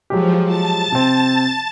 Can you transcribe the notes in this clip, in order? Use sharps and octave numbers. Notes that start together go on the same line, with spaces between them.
F3 F#3 G#3 G4
A5 A6
C3 C4